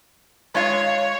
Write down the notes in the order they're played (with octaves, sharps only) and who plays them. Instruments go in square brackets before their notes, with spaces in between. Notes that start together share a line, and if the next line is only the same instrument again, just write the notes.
[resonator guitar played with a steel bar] G#3 F4 F5 [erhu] C#5